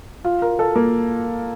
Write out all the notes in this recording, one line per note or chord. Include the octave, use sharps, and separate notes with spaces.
F4
A#4
A4
A#3